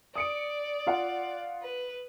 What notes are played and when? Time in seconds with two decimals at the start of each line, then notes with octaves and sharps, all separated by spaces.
0.15 D5 D#6 C#7 D7
0.87 F4 F5 F#5
1.63 B4